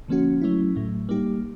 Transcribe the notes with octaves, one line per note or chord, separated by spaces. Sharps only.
D3 F3 A#3 C#4 F#4
F#3 A3 C#4 E4
A2 F#3 A3
G3 A#3 D#4 G4